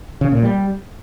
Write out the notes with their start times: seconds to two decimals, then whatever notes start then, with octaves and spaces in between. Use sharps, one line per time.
0.21 C#3
0.32 A#2
0.43 G3